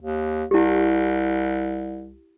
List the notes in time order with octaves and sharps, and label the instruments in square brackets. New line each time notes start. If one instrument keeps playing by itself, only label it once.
[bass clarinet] D#2
[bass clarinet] C2 [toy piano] E4 G4